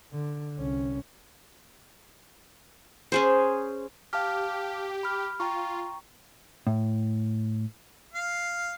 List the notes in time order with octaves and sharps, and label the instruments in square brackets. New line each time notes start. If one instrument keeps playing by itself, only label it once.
[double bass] D3
C2 C#4
[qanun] C#4 G#4 C5
[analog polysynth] G4 [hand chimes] F5 A5 F6
[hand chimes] B5 F6
[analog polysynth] F4 [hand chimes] G5 A#5 C#6
[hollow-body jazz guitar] A2
[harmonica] F5